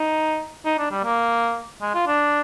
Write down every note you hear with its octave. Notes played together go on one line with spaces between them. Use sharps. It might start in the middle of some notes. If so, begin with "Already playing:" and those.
Already playing: D#4
D#4
D4
G3
A#3
G#3
F4
D4